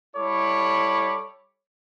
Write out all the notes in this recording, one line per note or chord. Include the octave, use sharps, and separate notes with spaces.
G3 E4 A4 C#5 B5 D6